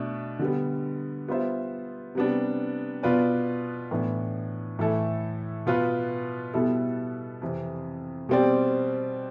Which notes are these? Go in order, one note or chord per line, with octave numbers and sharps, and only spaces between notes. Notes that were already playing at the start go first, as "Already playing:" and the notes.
Already playing: B2 A3 D4
D3 G3 B3
G3 B3 F4 C5 E5
C3 G3 B3 D4
B2 B3 F4 B4 D5
A2 E3 B3 D4
A2 E3 A3 E4 A4
B2 B3 F4 B4
B2 G3 B3 E4 A4
F2 C3 E3
B2 G3 C4 G4 D5